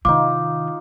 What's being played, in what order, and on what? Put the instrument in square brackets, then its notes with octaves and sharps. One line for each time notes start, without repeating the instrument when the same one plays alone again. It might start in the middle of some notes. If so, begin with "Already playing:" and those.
[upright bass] C3 D#3 [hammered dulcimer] D#4 F4 [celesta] D6